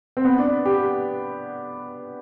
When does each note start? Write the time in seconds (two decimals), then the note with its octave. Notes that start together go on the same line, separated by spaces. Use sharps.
0.17 C4
0.25 B3
0.39 D4
0.65 G4